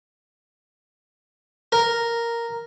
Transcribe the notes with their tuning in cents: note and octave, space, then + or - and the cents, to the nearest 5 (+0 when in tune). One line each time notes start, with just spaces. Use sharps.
A#4 +0